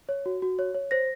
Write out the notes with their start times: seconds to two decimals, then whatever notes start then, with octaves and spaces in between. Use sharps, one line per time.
0.09 C#5
0.26 F#4
0.42 F#4
0.59 C#5
0.75 C#5
0.91 C5 A#6